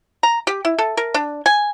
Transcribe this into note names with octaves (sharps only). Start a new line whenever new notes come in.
A#5
G4
E4
A4
A#4
D4
G#5